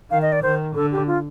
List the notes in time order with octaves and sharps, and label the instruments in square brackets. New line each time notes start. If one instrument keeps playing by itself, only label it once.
[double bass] D#3 [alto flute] F5
[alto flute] D#5
D5
[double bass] D#3 [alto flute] C5
[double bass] D3 [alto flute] A4
[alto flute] G4
F4